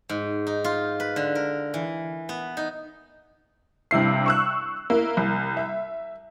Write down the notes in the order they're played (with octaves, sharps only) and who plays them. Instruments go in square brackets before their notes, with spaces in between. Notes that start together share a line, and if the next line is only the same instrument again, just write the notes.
[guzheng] G#2
D#4
F4
B4
D3
A#4
E3
B3
D#4
[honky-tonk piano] G2 C3 E4 C7
C#6 E6 F#6
A#3 E4
C2
E5